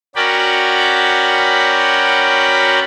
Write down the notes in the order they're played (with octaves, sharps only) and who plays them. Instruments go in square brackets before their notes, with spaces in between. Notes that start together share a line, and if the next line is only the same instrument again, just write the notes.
[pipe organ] C#4 F#4 A#4 D5 G5 B5